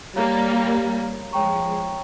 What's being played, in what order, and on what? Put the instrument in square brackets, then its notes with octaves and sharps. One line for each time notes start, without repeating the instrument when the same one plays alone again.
[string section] G3 A#3 [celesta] C#5 F5 A#5
[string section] F3 G#3 [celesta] C#5 G5 A#5 C#6